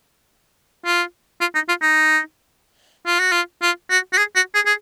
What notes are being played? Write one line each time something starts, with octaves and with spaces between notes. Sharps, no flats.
F4
F4
D#4
F4
D#4
F4
F#4
F4
F4
F#4
F#4
G#4
F#4
G#4
G#4